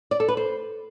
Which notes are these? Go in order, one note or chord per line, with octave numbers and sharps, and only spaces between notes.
D5
A4
B4
C5